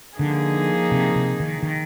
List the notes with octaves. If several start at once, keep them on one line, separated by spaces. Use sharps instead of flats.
D3 F3 A#3 D#4 G#4
C3
C3
D#3
D#3